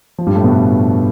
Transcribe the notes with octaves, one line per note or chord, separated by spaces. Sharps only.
F3
G2 G3
A2 A3
B2 B3
A2 A3